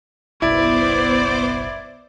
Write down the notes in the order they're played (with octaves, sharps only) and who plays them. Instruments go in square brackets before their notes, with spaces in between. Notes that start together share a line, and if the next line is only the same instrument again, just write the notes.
[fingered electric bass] F#1 B1 [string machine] B3 C5 D6 [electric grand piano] E4 [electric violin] D5